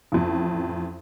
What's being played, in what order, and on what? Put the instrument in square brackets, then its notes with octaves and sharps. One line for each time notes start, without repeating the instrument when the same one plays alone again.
[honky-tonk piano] A1 F2